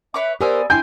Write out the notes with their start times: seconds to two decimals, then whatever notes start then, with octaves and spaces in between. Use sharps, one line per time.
0.14 B4 C#5 E5 D6
0.41 B3 G4 A#4 C5 D5 G#5 E6
0.70 D4 E4 G5 G#5 C6 G6